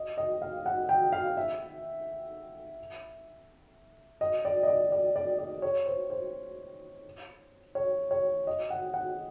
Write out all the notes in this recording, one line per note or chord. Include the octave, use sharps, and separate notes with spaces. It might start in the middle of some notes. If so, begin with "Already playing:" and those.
Already playing: D#5
D#5
F5
F#5
G5
F5
E5
D#5
D5
D#5
D5
D5
D5
D5
C#5
C5
C5
C#5
C#5
D#5
F#5
F#5